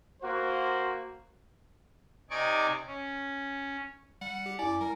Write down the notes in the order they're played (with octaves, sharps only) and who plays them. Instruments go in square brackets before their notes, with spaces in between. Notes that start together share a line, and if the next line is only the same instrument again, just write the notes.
[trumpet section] A#3 F#4 [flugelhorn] C5
[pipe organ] C3 D#4 D5 G#5 C#6 D6
C#4
[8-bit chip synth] G3 [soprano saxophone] F#5
[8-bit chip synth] G4
[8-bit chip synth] F#2 D6 [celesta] E4 G#5 [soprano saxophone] D5
[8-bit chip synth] G3 [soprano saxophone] A#4